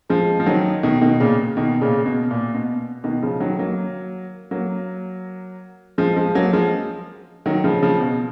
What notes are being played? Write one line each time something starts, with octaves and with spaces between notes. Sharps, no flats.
F3 G#3
F3
D#3 F#3
B2 D#3
B2 D#3
A#2 C#3
B2 D#3
A#2 C#3
B2
A#2
B2
B2 D#3
C#3 F3
D#3 F#3
F#3 A#3
F#3 A#3
F3 G#3
F3 G#3
F#3 A#3
F3 G#3
D#3 F#3
C#3 F3
C#3 F3
B2